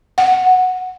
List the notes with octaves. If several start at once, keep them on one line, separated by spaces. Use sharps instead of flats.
F#5